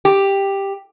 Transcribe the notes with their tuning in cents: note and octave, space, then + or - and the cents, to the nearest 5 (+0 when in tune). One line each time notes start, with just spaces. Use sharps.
G4 +5